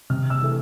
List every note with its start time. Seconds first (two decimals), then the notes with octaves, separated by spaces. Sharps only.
0.10 C3 F6
0.30 E6
0.42 E3 A3